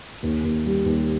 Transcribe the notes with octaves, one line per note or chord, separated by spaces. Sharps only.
D#2
D#2
G3
D#2